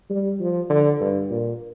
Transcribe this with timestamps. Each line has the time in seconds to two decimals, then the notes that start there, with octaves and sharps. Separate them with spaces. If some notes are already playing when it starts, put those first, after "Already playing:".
0.10 G3
0.40 F3
0.70 D3
1.00 G2
1.30 A#2